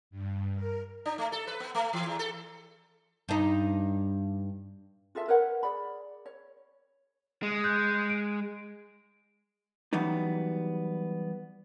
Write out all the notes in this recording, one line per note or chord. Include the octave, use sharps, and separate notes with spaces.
G2
A#4
D4
A3
A4
B4
B3
A3
E3
E2
A4
G2 D#4
F4 G#4 A4 E5
A#4 B4 C#5 F#5
G#4 D5 B5
C#5
G#3
F#6 G6
D7
E3 F#3 G3 B3 D#4